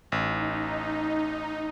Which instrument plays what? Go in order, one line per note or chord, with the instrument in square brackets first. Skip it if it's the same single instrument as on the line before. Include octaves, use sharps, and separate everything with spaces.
[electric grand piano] A1 [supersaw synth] D#4